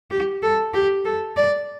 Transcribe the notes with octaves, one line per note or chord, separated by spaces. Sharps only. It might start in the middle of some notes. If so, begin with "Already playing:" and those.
G4
A4
G4
A4
D5